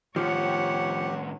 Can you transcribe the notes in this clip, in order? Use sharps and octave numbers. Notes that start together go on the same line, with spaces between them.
A2 D#3 F3 G4 C#5 F#5